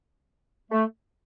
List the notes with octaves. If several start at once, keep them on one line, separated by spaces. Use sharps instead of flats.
A3